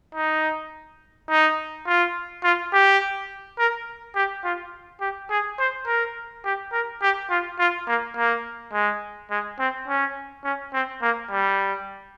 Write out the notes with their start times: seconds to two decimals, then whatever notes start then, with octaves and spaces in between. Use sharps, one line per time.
0.15 D#4
1.30 D#4
1.87 F4
2.44 F4
2.73 G4
3.59 A#4
4.15 G4
4.44 F4
5.01 G4
5.30 G#4
5.59 C5
5.87 A#4
6.45 G4
6.72 A#4
7.02 G4
7.30 F4
7.59 F4
7.87 A#3
8.17 A#3
8.73 G#3
9.30 G#3
9.59 C4
9.88 C#4
10.44 C#4
10.74 C4
11.02 A#3
11.30 G3